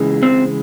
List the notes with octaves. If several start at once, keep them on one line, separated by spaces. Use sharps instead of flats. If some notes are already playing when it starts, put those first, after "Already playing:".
Already playing: C#3 E3 G#3
C4